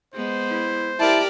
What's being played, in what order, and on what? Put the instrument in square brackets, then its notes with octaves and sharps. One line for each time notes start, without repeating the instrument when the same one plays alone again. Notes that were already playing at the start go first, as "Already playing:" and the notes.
[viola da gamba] G#3 B3 [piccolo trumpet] C5
[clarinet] E4
[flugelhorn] E4 [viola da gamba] G4 A#4 D5 [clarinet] A5